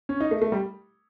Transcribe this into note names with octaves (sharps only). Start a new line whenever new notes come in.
C#4
D#4
A3
A3
G3